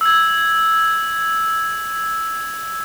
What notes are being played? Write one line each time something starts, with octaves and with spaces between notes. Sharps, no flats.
E6 G#6